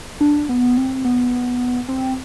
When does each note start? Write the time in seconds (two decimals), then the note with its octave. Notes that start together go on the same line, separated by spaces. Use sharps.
0.21 D4
0.49 B3
0.77 C4
1.05 B3
1.89 C4